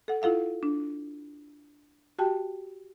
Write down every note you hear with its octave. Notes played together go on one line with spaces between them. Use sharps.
A4 F#5
E4 F4 A4 F5 F#5
D4
F#4 G4 G5 A5